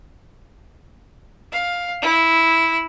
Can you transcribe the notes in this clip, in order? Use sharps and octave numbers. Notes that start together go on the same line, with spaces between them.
F5
E4